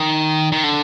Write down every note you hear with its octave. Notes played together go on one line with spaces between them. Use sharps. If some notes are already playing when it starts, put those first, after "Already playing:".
Already playing: D#3
D#3
D3